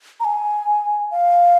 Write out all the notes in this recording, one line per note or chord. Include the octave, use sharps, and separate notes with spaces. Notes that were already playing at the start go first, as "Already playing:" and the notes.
A#5
G#5
F5